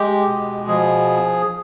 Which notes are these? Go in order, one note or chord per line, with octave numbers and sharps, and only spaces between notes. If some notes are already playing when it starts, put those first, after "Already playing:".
Already playing: G#3 G4
B2
F3 G#4